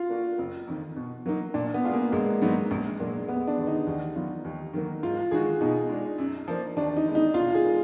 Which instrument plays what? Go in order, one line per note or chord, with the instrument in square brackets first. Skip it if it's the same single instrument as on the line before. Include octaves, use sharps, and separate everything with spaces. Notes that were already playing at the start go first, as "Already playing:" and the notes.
Already playing: [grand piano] F4
[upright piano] A#3 D4 F#4 A#4
F#1
F2 D#3
B2
F#3 A#3 D#4
[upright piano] A#2 [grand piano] D4
[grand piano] B3
[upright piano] G#3 D4 F4 G#4
[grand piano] A#3
[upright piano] A#1 [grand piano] G#3
[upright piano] G#2 F#3 B3 D#4
A#1
A#2 F#3 A#3 D4
[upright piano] F1 [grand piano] B3
[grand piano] D4
[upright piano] D#2 D3
[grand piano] D#4
[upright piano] D#2
D#3 F#3 B3 F4
D#2
D#3 F#3 A#3
[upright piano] G#2 [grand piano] F4
[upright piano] D#3 G#3 D#4 F#4 [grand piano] G#4
[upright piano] B2 [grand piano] D#4
[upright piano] G#3 D4
F#2
F3 A#3 D4
[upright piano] D#2 [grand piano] D4
[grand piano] D#4
[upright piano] D#3 G#3 B3
[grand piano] D#4
[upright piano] B2 [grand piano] F4
[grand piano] G#4
[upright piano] G#3 D#4 A#4